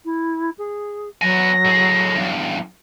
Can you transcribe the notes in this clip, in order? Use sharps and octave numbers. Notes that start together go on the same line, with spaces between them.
E4
G#4
F#3 B3 G#5 A#6
A2 G#4
E2 G2